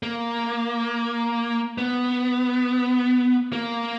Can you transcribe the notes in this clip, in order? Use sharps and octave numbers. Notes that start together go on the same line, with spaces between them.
A#3
B3
A#3